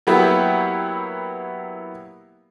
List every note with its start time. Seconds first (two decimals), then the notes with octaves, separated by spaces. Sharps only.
0.07 F#3 A#3 B3 E4 F#4 G4